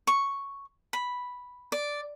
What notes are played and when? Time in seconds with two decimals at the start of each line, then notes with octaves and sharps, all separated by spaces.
0.07 C#6
0.93 B5
1.72 D5